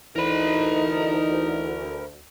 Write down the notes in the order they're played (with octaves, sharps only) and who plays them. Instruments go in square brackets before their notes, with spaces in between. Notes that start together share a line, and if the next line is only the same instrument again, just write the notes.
[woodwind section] D2 [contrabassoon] E3 [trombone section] D#4 [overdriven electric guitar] A#4 B5